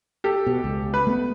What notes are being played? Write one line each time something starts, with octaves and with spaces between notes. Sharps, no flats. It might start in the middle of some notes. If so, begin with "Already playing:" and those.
G4 A4
B2
C#2
B4
A3 B3